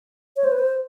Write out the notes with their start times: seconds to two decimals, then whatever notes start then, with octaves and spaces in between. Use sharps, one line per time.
0.36 C#5
0.44 C5
0.51 B4
0.59 C5